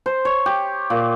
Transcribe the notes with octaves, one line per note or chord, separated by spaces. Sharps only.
C5
C#5
G4
A#2